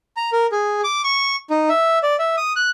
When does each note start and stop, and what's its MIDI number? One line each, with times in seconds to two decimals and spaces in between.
0.17 0.30 82
0.32 0.47 70
0.52 0.81 68
0.84 1.02 86
1.04 1.36 85
1.50 1.69 63
1.69 1.99 76
2.03 2.16 74
2.19 2.36 76
2.37 2.53 87
2.56 2.70 90